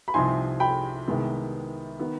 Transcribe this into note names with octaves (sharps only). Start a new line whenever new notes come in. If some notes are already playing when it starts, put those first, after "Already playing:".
B5
C2 C3 F3 C4 D#4 G#5 C6
G5 B5
C2 C3 D#3 G#3 B3
D#3 B3